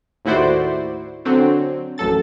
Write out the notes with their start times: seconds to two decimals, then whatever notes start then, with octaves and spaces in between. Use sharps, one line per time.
0.25 D#2 A2 E4 F#4 C5 D5
1.25 D3 F#3 C4
1.98 A1 F#2 A4 A6